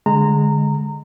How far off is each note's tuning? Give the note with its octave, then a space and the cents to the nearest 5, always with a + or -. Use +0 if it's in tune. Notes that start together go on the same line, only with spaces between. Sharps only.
D3 +0 G#3 +0 A#5 -20